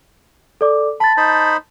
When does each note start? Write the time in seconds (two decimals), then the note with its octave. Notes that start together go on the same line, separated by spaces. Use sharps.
0.61 A4 D5 D6
1.00 A5 B5 A6
1.17 D#4 C5 B5